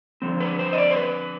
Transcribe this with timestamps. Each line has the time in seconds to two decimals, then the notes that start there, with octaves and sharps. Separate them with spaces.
0.22 D3 F3 C4
0.40 B4
0.59 C5
0.73 D#5
0.78 D5
0.91 C5
0.96 B4